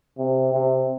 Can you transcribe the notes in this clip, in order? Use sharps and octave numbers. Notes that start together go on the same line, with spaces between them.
C3
C3